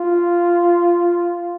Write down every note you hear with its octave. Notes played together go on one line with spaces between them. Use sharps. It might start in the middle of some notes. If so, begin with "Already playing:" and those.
Already playing: F4